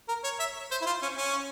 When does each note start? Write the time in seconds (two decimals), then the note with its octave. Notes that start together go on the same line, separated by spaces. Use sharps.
0.08 A#4
0.24 C#5
0.39 E5
0.71 C5
0.81 E4
0.86 F4
1.02 C#4
1.17 C#4